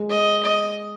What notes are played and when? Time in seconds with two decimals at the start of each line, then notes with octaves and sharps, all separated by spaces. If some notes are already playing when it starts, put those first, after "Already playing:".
Already playing: G#3
0.10 D#5
0.43 D#5